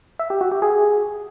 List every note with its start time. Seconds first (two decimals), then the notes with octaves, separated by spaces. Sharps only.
0.19 E5
0.30 G4
0.41 F#4
0.51 G4
0.62 G#4